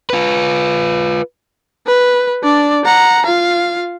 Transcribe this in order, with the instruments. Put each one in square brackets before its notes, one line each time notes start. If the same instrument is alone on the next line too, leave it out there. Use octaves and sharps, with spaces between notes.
[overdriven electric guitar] F4 B4
[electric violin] B4
D4 D5
F#5 A#5
F4 F5